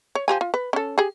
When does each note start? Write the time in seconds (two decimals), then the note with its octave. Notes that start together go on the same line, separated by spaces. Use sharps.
0.15 C#5
0.28 F3 G4 G#5
0.41 F4
0.54 B4
0.73 C#4 A4
0.98 G4 G#4